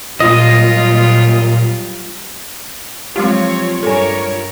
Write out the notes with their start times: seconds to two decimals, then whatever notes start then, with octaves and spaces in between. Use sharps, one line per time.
0.20 A#2 F#3 G3 F4 D#5
3.16 F3 F#3 G#3 C4 F4 G4 C#5
3.83 G2 G3 A4 A#4 C#5 G#5